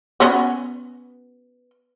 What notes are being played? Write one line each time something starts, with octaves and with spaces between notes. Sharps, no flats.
B3 C#4 F#4